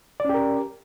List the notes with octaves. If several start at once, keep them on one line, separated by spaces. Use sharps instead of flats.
C#4 G4 A#4 D5